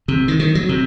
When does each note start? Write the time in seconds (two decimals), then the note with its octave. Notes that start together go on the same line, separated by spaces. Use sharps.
0.08 C3
0.28 D#3
0.40 D#3
0.55 F#3
0.69 C3